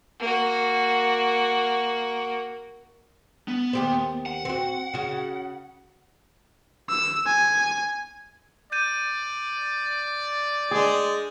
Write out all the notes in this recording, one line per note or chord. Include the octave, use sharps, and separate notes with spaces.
A#3 F#4
B3
D#2 G4 C5
F#5
C4 F#4
C#3 F#4
E6
G#5
D5 G6 D#7
G#3 D4 G#4